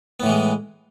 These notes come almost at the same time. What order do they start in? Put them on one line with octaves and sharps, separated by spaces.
B3 A2 E3 G#3